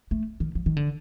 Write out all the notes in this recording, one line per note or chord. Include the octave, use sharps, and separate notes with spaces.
A3
D#3
F3
D#3
D3